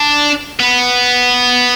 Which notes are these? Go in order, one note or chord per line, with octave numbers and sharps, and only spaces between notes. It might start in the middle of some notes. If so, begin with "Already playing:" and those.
Already playing: D4
B3